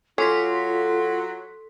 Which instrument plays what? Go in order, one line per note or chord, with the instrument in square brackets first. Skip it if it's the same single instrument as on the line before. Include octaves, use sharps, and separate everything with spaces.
[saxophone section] F#3 [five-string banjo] C#4 [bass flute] F4 [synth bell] A4 C6 B6